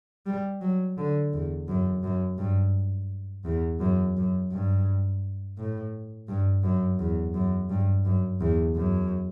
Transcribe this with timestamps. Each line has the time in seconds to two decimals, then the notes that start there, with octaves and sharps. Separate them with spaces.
0.26 G3
0.61 F#3
0.97 D3
1.33 E2
1.68 F#2
2.03 F#2
2.38 G2
3.45 E2
3.80 F#2
4.16 F#2
4.51 G2
5.57 A2
6.28 G2
6.63 F#2
6.99 E2
7.34 F#2
7.70 G2
8.05 F#2
8.40 E2
8.76 F#2